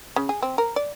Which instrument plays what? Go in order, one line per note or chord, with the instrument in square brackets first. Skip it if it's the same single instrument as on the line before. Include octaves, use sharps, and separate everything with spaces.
[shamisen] C#3
G#4
C4
A#4
D5